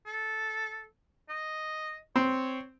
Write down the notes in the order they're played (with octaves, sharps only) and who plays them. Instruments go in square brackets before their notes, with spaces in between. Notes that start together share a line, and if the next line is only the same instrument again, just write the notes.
[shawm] A4
D#5
[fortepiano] C4 [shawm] C#5